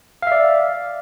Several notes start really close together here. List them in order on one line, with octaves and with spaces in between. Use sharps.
F5 E5 D5